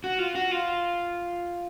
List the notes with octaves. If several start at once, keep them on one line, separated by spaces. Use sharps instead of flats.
F#4
F4
F#4
F4